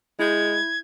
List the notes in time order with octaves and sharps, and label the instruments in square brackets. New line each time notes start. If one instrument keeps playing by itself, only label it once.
[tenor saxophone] G#3 [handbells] E4 G6 [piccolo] G#6